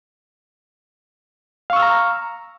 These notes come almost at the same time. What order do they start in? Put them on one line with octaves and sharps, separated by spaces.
F5 C#6 E6 F6 A#5